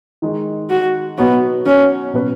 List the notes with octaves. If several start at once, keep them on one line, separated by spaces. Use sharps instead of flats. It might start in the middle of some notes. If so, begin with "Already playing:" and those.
D#3 G#3 D#4
F#4
B2 F#3 B3 D#4 F#4 C#5
C#4
B2 F#3 C#4 B4